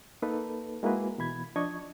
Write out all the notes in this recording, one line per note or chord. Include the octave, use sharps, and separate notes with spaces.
A#3 D#4 A4 B4
G#3 A#3 E4 F#4 G#4 B4
B2 E3 B5 G#6
F3 D4 D#5 C#6 G#6